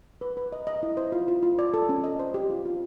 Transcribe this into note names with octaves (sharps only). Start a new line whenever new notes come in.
B4
B4
D#5
D#5
E4
C5
F4
F4
F4
D5
A4
C#4
D#5
C5
G4
F4
F4